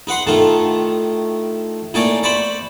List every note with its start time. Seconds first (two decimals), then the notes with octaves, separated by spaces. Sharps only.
0.07 D#4 B4 F#5 C6
0.27 A2 D#3 A3 D#4 F4
1.94 A2 A#3 D#4 C#5 D5 G#5
2.23 C5 D5 B5 C#6